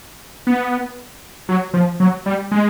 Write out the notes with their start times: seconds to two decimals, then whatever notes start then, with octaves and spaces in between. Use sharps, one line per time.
0.47 B3
1.49 F#3
1.74 F3
2.00 F#3
2.26 G3
2.51 G#3